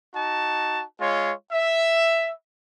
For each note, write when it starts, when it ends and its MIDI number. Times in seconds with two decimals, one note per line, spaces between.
0.15 0.83 63
0.15 0.83 66
0.15 0.83 81
0.99 1.32 56
0.99 1.32 65
0.99 1.32 73
1.52 2.30 76